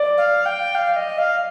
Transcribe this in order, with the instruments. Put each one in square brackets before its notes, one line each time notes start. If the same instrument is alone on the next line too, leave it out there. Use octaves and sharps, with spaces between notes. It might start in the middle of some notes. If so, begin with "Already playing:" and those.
Already playing: [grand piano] D5
[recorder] F5
G5
F5
D#5
F5